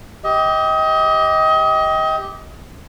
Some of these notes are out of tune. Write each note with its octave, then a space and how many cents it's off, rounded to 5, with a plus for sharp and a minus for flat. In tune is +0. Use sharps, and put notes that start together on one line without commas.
G4 -5 D#5 +30